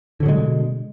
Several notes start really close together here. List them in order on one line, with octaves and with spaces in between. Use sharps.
D3 F#3 B2 G#3